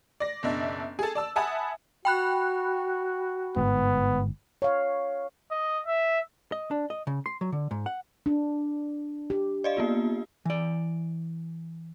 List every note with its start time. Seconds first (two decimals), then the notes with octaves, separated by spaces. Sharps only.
0.20 D5 A#6
0.43 F#1 B2 D4 E5
0.99 G#4 A4
1.15 D5 A5 E6
1.36 E5 F#5 G#5 A5 B5 D#6
2.05 F#4 G5 B5 F#6
3.57 G1 G#2 B3
4.62 C#5 F5
5.51 D#5
5.87 E5
6.52 D#5
6.71 D4
6.90 D#5
7.07 C#3
7.26 C6
7.41 F#3
7.52 D3
7.71 G#2
7.86 F#5
8.26 D4
9.30 G4
9.64 D5 D#5 F5
9.77 A#3 B3 F4
10.45 E3 D5